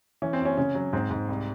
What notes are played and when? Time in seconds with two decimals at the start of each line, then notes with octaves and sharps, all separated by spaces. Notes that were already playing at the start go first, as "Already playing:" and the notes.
0.22 E3 C#4
0.33 C4
0.40 F#2
0.45 C#4
0.57 C#3 C#4
0.75 F#3
0.93 G#2 C4
1.11 G#2
1.29 C2